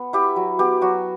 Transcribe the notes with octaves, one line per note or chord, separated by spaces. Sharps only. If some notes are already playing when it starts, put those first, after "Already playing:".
Already playing: B3
E4 G4
F#3
B3 G4
F#3 F#4